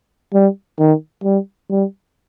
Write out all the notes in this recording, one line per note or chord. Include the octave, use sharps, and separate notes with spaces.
G3
D#3
G3
G3